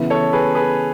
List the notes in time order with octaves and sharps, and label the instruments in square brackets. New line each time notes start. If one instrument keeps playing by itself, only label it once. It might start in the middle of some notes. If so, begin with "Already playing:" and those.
Already playing: [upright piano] C#3 E3 B3 E4
[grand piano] A4 C#5
G#4 B4
G#4 B4